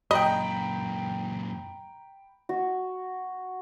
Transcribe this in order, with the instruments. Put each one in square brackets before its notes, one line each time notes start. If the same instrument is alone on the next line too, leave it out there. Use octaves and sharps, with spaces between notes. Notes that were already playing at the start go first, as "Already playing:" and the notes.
[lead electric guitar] F#2 A#2 [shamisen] D#5 [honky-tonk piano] G5 B5 [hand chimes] A#5
[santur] F#4